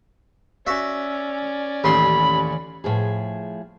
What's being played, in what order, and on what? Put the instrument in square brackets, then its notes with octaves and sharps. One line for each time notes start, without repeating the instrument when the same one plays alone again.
[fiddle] C#4 D5 [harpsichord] F#4 E5
[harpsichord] A1 D#2 C6 [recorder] B5
[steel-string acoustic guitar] A2 F3 G#4